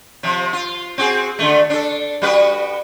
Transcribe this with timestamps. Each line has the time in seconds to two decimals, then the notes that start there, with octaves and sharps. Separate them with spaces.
0.23 C3 F3
0.53 F4
0.98 C4 F#4 G#4
1.39 D3 D#3 A3
1.70 D4 A4
2.22 G3 F#4 B4